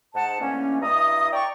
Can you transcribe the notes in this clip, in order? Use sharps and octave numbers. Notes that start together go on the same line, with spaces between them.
G#2 F#5 A5
D3 E3 A3 A#3 C#4
G2 E4 D#5 A#5 D#6
D5 G5 A#5 C#6